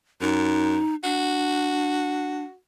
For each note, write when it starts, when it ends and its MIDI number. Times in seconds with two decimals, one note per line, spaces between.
0.21 0.80 42
0.21 0.95 63
1.04 2.43 62
1.04 2.56 66